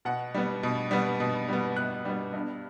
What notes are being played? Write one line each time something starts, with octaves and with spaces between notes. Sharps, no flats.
B2 F#5
G3 B3
B2
G3 B3
B2
G3 B3
B2 F#6
G3 B3
G2